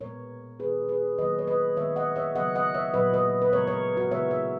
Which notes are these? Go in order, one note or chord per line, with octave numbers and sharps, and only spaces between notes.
A#2 G#3 B3 A#4 C#5
D#3 G#3 B3 G#4 B4
G#4 B4
D#3 F#3 A#3 B4 D#5
C#5
B4 D#5
D#3 G#3 B3 C#5 E5
D#5 F#5
C#5 E5
C#3 F#3 B3 D#5 F#5
D#5 F#5
C#5 E5
A#2 F#3 B3 B4 D#5
B4 D#5
B4
C#3 G#3 B3 A#4 C#5
A#4 C#5
F#4 A#4
C#3 E3 G#3 B3 C#5 E5
C#5 E5